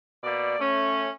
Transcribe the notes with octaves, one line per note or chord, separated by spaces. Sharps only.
B2 A#3 D5
A3 C#4